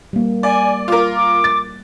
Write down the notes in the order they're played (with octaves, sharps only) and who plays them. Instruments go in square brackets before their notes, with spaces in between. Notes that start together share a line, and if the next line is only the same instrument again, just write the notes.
[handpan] G3 A#3
[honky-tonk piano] D5 [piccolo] G#5
[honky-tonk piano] F4 A#4 [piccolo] D6
[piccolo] D6
[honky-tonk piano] A6